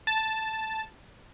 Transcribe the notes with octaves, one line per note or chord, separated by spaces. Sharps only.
A5